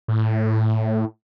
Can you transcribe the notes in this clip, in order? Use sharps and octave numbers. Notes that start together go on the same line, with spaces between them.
A2